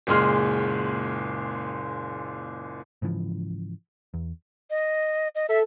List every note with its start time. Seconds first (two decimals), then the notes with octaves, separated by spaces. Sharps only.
0.07 F#1 A#2 G#3 G#4 C6 F6
3.02 G#2 C#3 E3 F3
4.14 E2
4.70 D#5
5.35 D#5
5.49 A4 E5